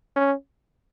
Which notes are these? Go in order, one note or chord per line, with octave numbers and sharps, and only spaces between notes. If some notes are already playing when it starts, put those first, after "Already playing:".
C#4